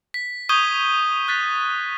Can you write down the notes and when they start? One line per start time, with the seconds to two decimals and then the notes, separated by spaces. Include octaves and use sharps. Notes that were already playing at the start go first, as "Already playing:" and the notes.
0.14 B6
0.49 C#6 D#6 G6 G#6 D#7 G7
1.28 F#6 A6 B6